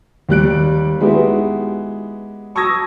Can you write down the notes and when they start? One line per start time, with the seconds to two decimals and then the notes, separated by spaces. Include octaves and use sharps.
0.29 D#2 G3 F#6 D7
1.00 G#3 B3 D#4 E4 F#4 G4
2.55 A5 C#6 D#6 E6 G#6 A#6